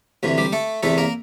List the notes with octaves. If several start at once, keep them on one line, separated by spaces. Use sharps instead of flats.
D2 C3 E3
G3 G4
A3 A4
E2 C3 E3 A3 A4
A#3 A#4